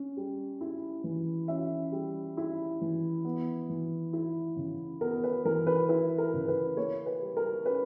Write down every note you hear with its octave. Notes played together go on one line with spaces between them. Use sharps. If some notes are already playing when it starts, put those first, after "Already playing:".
Already playing: C#4
G3
E4
E3
C#4 E5
G3
E4
E3
B3
E3
E4
C#3
B3 A#4
B4
E3 A#4
B4
E4 B4
A#4
C#3
B4
A#3 C#5
B4
G3
A#4
C#4 B4